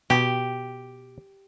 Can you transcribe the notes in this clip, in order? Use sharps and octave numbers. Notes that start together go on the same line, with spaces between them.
B2 G4